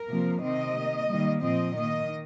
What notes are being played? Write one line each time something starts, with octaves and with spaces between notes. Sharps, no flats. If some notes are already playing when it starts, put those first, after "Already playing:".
Already playing: A#4
C3 F3 A#3
C3 D#3 C4 D#5
D#3 A#3
D#3 G3 A#3
A#2 F3 C4 D#5
D#3 A#3 D#5